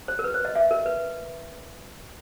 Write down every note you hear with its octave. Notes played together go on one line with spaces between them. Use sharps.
C5
A#4
B4
C5
D#5
E5
A#4
B4